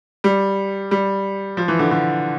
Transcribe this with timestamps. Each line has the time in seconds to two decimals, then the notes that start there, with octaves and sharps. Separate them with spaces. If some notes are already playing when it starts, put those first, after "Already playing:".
0.24 G3
0.91 G3
1.57 F3
1.68 E3
1.79 D3
1.91 D3